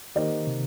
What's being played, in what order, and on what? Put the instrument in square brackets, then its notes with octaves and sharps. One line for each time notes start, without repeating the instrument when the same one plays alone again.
[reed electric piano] D#3 [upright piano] A#3 D#4 G4 C5 D#5
[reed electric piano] C3